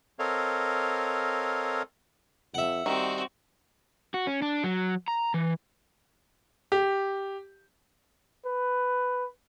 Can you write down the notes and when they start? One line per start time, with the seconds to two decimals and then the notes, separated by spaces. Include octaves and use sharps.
0.19 C4 A4 A#4 C#5 D#5 F5
2.54 F2 E5 F#5
2.86 D#3 G3 C4 F#4
4.14 F#4
4.27 C#4
4.42 D4
4.64 F#3
5.08 A#5
5.34 E3
6.72 G4
8.46 B4